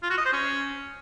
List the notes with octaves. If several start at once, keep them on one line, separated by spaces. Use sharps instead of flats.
F4
F#4
D#5
C5
C#4